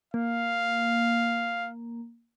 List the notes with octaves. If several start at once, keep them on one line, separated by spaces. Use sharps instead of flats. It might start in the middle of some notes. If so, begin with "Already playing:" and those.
A#3 F5